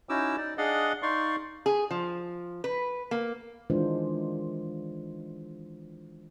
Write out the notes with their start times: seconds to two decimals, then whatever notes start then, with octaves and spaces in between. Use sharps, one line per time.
0.09 C#4 D#4 E4 F#4 D6 E6
0.37 D#4 D5
0.58 D4 G#4 D5 D#5 F5 F#5
1.02 D#4 D5 F5 C6 C#6
1.66 G#4
1.91 F3
2.64 B4
3.11 A#3
3.70 D#3 E3 G#3 D4 F4 C5